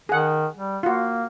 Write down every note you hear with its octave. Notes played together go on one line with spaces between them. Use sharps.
D#3 G#4 F#5
G3
A#3 F4 F#4